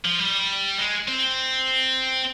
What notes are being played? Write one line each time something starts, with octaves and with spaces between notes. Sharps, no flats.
F3
G3
G#3
C4